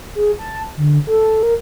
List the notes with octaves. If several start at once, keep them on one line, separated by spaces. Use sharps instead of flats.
G#4
A5
D3
A4
A#4